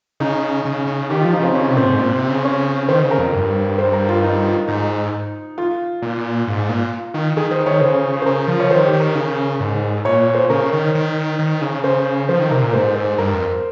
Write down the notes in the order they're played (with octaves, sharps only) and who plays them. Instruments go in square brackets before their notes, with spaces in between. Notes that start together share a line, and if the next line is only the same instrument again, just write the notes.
[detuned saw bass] C#3 [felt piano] D#4
[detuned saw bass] C#3
C#3
[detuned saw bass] D#3 [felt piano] G4
[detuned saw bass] F3 [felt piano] F4
[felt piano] D#4
[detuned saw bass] C#3 [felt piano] C4
[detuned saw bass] C#3 [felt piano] C#4
[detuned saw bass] C3
[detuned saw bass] A#2 [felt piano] C4
[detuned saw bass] G#2
A#2
C3
C#3
[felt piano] C#4
[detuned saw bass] D#3 [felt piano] C5
[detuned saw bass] C#3 [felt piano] C5
[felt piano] A#4
[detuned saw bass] F2
G2
[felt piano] C5
A#4
F4
D#4
F4
[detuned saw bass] G#2 [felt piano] D#4
[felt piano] F4
[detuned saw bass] A#2
G#2
A#2
D#3
[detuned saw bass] D#3 [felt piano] G#4
[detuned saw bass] D#3 [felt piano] C5
[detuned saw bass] D#3 [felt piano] C#5
[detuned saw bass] C#3 [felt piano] C5
[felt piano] C5
[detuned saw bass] C#3 [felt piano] A#4
[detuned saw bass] F3
[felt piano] C#5
[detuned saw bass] D#3 [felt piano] C5
[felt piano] G4
[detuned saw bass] D#3
[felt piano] A#4
[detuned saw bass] C#3
G#2
[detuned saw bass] A#2 [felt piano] C#5
[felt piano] C5
[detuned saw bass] C#3 [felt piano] A#4
[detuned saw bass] D#3
D#3
D#3
C#3
[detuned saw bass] C#3 [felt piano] C5
[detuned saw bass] F3 [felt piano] C5
[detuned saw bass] D#3
[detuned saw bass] C3 [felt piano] A#4
[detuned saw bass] A#2
[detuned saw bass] G#2 [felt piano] C5
[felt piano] C5
[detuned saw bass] G2 [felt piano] A#4
[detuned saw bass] F2